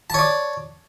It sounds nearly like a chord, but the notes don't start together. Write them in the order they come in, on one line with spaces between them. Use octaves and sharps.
A5 C#5 D5